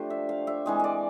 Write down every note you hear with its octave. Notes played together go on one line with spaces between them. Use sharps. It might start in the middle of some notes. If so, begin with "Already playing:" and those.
Already playing: F3 A3 D4 G4 C5
E5
F5
E5
E3 G#3 C4 D#5
D5 D#5